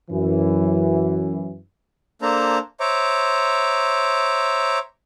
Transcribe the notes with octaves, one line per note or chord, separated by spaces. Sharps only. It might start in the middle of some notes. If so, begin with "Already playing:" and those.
F#2 E3
A#3 D4 A4 C5 A#5
C5 C#5 E5 A#5 D6